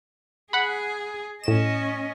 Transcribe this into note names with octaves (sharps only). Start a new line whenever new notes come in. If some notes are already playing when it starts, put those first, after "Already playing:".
G#4 F#5 B5
A2 C#4 D#5 E7